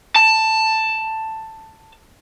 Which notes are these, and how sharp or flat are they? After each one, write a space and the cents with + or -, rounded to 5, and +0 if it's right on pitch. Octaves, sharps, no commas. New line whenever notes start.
A5 +10